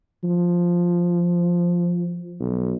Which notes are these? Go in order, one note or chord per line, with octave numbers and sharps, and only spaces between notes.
F3
B1